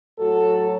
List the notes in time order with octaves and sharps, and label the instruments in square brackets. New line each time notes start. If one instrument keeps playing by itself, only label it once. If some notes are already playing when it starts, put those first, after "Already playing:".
[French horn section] A2 F#3 F#4 A4